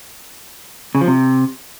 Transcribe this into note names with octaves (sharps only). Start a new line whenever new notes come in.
C#3
F3
C3